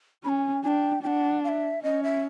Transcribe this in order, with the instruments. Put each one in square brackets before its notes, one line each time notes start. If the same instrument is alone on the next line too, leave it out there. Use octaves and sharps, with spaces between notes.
[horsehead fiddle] C#4 [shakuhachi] B5
[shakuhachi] G#5
[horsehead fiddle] D4 [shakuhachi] G5 G#5
[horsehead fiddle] D4 [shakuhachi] G5
[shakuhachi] F#5
F5
E5
[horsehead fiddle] C#4 [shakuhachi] D#5
[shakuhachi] E5